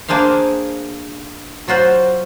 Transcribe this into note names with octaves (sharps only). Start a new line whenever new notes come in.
A#3 D4 G#4 C5 F5
F#3 F4 F#4 C5